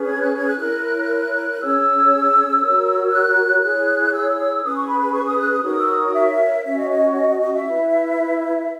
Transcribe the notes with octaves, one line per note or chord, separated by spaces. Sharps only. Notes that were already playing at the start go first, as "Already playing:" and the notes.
Already playing: C#4 G#4 B4
G#6
F#6
G#6
F#6
E4 A#4 C#5 F#6
C#4 G#4 C#5 E6
F#4 A#4 C#5
F#6
E4 G#4 C#5 F#6
E6
C#4 G#4 B4 D#6
C#6
B5
B5
C#6
D#6
F#6
D#6
D#4 F#4 A#4 C#5 D#6
E6
D#6
E5
C#4 F#4 C#5 E5
D#5
D#5
C#5
D#5
D#5
D#5
E5
E4 B4